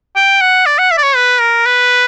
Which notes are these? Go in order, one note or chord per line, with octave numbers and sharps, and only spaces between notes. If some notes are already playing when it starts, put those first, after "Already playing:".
G5
F#5
D5
F#5
E5
D5
C#5
B4
A#4
B4